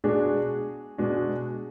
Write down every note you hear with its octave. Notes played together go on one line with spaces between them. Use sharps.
B2 G#3 D4 F#4 G#4
B2 G#3 D4 F#4